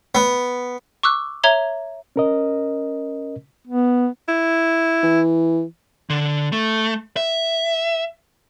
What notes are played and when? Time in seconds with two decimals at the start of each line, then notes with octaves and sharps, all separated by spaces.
0.15 B3
1.03 C#6 D6 E6 F#6
1.44 C#5 E5 A#5 G#6 F7 G7
2.16 C#4 A#4 D#5
3.67 B3
4.28 E4
5.03 E3
6.10 D3
6.52 A3
7.17 E5